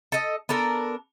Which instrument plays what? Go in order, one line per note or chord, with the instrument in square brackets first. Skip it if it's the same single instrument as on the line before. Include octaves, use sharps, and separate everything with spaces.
[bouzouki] A4 D#5
B3 D4 A4 A#4